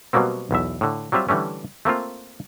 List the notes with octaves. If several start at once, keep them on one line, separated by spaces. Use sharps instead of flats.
B2 F#3 G3 A#3 C4
B1 E2 E5
A2 D3
F#3 G3 C4 F4 E5
D3 E3 G3 A3 C#4
A3 A#3 C4 F4